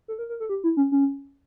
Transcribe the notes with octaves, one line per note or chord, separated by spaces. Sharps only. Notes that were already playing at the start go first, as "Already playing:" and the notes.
A4
A#4
A#4
A4
G4
E4
C#4
C#4